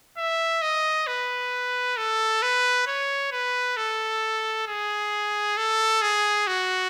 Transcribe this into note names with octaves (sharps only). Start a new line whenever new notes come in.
E5
D#5
B4
A4
B4
C#5
B4
A4
G#4
A4
G#4
F#4